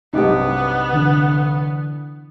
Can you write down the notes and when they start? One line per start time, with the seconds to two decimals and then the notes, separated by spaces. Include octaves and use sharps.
0.14 B1 G2 C3 B3 D#4 G4 D#5 D6
0.93 D3 E3 D4